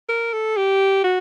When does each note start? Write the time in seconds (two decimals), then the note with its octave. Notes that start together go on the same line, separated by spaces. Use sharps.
0.09 A#4
0.33 A4
0.57 G4
1.04 F#4